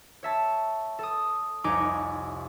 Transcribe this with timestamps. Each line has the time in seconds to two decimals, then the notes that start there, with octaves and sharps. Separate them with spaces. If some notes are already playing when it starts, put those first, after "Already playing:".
0.23 C#5 E5 A5
0.99 A4 D#6
1.64 F1 C2 D#4 C#5 G#5 D6